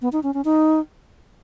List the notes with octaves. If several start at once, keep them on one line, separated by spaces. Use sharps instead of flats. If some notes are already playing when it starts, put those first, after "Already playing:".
B3
D#4
C#4
C#4
D#4